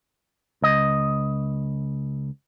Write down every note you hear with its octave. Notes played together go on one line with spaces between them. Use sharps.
C#2 D#5